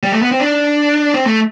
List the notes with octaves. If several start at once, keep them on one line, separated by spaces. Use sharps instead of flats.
G3
A3
B3
C4
D4
C4
A3